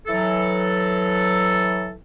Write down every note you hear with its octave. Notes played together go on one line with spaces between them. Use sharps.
E3 F#3 A4